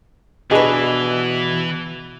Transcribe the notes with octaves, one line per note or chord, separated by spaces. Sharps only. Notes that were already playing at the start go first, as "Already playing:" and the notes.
B2 E3 D4 F#4 G#4 B4 D#5